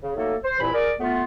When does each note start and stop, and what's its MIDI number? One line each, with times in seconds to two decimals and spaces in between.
0.02 0.13 49
0.16 0.35 54
0.16 0.35 57
0.16 0.35 58
0.16 0.35 63
0.16 0.35 69
0.44 0.58 72
0.60 0.71 36
0.60 0.71 43
0.60 0.71 46
0.60 0.71 52
0.60 0.71 64
0.60 0.71 83
0.72 0.93 68
0.72 0.93 70
0.72 0.93 74
1.00 1.24 57
1.00 1.24 59
1.00 1.24 65